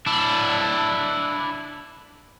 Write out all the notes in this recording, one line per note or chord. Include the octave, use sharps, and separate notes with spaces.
D4 E4